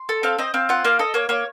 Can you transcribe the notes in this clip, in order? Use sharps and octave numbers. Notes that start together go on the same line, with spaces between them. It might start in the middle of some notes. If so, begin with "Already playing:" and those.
Already playing: C6
A4
C4 F5
C4 D#5
C4 F5
F4 F#5
A#3 F5
A4 D#5
A#3 C#5
A#3 C#5